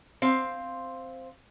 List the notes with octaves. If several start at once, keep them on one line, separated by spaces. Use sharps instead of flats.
C4 F5